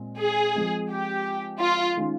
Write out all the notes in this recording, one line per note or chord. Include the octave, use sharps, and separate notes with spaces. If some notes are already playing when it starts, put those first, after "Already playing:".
Already playing: A#2 G#3 C4
G#4
F3 G#3 C4
G4
F4
D#3 G#3 C#4